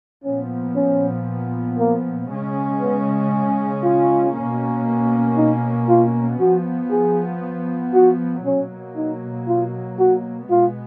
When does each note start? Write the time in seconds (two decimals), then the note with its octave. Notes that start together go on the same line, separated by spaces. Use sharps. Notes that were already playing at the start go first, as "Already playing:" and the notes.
0.24 A#2 F3 B3 C#4
0.75 C#4
1.78 A#3
2.29 C#3 G#3 C#4
2.81 B3
3.83 F4
4.35 B2 A#3 C#4
5.37 D#4
5.88 F4
6.40 F3 B3 F#4
6.91 G#4
7.94 F#4
8.45 B2 F#3 A#3 C#4
8.96 D#4
9.48 F4
9.99 F#4
10.50 B2 G#3 B3 F4